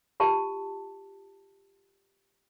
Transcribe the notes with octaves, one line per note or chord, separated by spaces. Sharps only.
F4 G4 A5